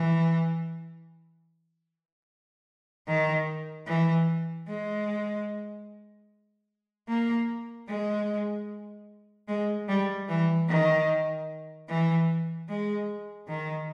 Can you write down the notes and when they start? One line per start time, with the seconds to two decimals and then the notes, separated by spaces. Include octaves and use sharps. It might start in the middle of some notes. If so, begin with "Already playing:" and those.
Already playing: E3
3.08 D#3
3.87 E3
4.68 G#3
7.08 A#3
7.88 G#3
9.48 G#3
9.88 G3
10.28 E3
10.69 D#3
11.89 E3
12.69 G#3
13.48 D#3